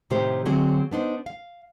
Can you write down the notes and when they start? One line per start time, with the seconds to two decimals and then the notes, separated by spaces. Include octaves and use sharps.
0.10 A2 C3 D#3 A3 G4 C5
0.45 D3 F#3 C4 F#4 G#4
0.91 B3 D4 D#4 C5
1.26 F5